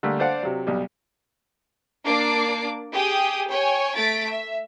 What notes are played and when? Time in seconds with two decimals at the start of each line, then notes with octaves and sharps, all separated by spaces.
0.03 D3 G3 A3 A#3
0.19 D4 A4 C5 D5 F5 F#5
0.43 C3 F#3
0.67 B1 G3
2.05 A#3 D4 D6 C7
2.93 G4 G#4 G5 D#6
3.49 C#5 G5 G#5
3.95 A3 A6 B6 D7
4.29 E5